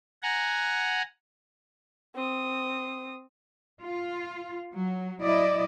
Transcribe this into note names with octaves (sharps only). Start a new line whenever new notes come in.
F#5 G#5 A#5
C4 D#6
F4
F#3
F#3 E4 D5 D#5